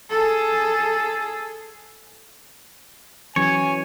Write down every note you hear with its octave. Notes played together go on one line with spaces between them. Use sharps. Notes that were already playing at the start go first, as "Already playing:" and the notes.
G#4 A4
E3 F#3 C#4 C#5 G#5